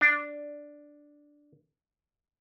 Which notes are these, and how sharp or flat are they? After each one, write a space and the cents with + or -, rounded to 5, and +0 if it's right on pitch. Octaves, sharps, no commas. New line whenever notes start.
D4 +0